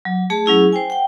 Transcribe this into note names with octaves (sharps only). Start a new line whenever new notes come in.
F#3
A3 G#4 A5
F#3 C#4 E4 G#4
C5 G5 G#5
F#5 G5